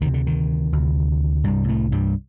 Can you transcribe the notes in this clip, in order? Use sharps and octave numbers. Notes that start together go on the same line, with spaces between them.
D2 C3 D#3
D3
D#3
D2 C3
C2 G2 C3 G3
A2 A3
G2 G3